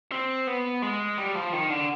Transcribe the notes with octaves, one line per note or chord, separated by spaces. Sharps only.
C4
B3
G#3
G3
F3
D#3
D3